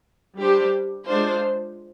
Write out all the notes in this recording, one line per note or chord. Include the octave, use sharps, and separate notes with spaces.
G3 D4 G4 C5
G#3 D4 F4 C5